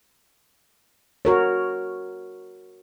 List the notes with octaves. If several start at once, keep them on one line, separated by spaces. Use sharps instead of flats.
F#4 A#4 C#5